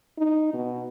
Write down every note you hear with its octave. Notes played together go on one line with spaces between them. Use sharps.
D#4
B2